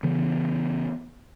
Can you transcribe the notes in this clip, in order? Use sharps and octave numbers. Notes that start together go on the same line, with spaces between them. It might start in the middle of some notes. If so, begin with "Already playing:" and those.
C#3 E3 B3